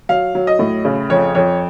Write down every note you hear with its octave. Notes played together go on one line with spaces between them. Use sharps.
F#3 F5
F#3
D#5
A2
C#3
F2 C#5
F2 C#5